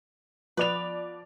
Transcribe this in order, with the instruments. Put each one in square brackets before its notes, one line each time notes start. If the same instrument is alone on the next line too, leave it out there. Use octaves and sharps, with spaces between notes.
[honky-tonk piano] F3 D5 F7 [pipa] B3 B4